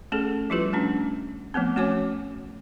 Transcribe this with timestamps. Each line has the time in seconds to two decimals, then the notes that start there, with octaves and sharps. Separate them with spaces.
0.12 A3 C#4 G#4 A4
0.50 F3 G3 E4 F4 G4 B4
0.73 A3 C#4 D4
1.54 F3 A3 B3 C4
1.76 A3 C#4 F#4 C#5 G#5 D6